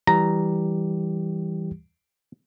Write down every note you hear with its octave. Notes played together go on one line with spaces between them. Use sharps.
E3 G3 G4 A#5